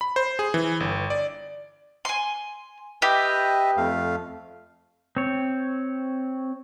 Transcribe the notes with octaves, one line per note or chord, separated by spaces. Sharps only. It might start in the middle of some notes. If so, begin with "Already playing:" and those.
B5
C5
G#4
E3
G1
D5
G#5 C6
G4 B4 D#5 E5
F2 A3 F5
C4 C#5